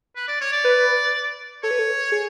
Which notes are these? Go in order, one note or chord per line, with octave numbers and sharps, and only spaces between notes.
B4
D5
C#5
D5
B4
A4 C#5
B4
A4
G#4